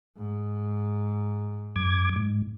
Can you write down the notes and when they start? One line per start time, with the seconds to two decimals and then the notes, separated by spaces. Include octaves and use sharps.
0.17 G#2
1.76 F#2 D6 G#6
2.16 G#2